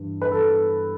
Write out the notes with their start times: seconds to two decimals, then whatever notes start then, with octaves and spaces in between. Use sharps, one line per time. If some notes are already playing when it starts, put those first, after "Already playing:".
Already playing: G2 E3
0.22 B4
0.32 A4